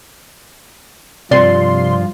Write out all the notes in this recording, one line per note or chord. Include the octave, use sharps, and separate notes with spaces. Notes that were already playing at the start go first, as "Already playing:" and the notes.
G2 C3 F3 F4 D5 C6